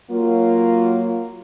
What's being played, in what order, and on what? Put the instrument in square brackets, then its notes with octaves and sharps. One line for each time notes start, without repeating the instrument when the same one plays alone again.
[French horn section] F#3 A#3 F4